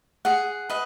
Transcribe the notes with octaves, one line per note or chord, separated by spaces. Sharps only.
G#4 F#5
B4 D#5